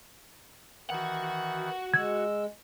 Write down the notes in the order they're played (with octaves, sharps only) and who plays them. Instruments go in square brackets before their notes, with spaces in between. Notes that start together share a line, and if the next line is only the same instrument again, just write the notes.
[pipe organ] D#3 E3 [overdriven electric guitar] F#4 F#5
[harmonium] G#3 [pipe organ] E6 [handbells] G#6